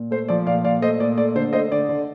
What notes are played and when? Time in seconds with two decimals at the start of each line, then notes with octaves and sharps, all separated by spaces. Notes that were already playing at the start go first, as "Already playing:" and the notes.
Already playing: A#2
0.11 A3 C5
0.28 F3 D5
0.46 A#2 D5 F5
0.65 A#2 D5 F5
0.82 A3 C5 D#5
1.00 A#2 D5
1.18 A3 D5
1.35 D3 C5
1.53 A3 C5 D#5
1.72 D3 D5
1.89 D3